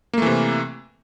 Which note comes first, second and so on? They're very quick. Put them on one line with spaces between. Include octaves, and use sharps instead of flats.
A#3 A3 E3 C3